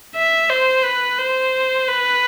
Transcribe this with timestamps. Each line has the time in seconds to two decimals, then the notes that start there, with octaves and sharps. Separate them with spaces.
0.16 E5
0.50 C5
0.85 B4
1.19 C5
1.88 B4